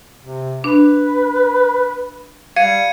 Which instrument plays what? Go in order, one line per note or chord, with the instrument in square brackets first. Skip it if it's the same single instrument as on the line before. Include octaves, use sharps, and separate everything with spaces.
[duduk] C3
[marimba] D4 [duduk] B4
[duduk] G3 [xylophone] F5 [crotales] G#6 C#7 D#7